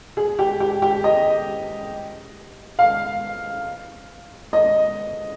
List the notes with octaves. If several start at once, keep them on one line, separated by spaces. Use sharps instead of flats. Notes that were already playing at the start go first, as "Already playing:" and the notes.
G#4
G4
G4
G4
D#5
F5
D#5